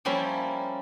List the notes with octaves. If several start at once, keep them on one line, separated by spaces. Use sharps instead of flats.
F3 G3 A#3 C#4 E4